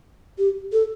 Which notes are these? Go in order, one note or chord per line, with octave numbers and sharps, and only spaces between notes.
G4
A4